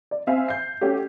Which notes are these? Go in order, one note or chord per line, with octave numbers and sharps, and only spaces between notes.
D5
C4 E5 F5 G#5
G6 C7
A3 C#4 F#4 G4